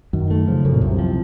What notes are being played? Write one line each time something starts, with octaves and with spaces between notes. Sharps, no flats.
F#2 D#3
A3
C#3 F3
F#2
A#2
C2 C3
F3